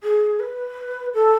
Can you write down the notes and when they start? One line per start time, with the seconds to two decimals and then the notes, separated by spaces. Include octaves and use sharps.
0.03 G#4
0.40 B4
1.14 A4